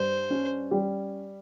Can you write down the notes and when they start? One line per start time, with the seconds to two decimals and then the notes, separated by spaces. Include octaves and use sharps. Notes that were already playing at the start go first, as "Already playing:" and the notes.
Already playing: G2 C5
0.30 C#4
0.71 G3